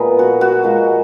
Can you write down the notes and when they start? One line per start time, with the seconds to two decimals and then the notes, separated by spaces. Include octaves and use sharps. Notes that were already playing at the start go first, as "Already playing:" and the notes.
Already playing: A#2 F3 G#3 B3 D#4 G#4
0.19 F#4
0.41 F#4
0.63 A#2 F3 G#3